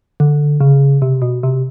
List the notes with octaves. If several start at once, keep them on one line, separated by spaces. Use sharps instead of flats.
D3
C#3
C3
B2
C3